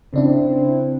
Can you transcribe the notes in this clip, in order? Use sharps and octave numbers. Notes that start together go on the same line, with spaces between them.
C#3 C4 D4 E4